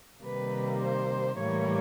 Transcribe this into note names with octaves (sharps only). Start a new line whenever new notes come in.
C3 D#3 G3 A#3 B4
C5
A2 E3 G3 A#3 C#5